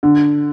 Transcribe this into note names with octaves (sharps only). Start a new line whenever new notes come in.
D3